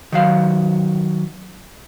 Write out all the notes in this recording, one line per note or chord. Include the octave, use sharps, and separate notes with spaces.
D#3 F#3 F5